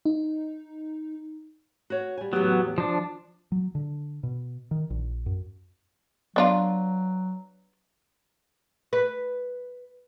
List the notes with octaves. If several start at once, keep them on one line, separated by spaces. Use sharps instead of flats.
D#4
F#4 C#5
G3 G#5
E2 A2 F#3 B3 G4
F3 D4
F#3
D3
B2
D#3
A#1
F#2
F#3 B3 D4 F4
B4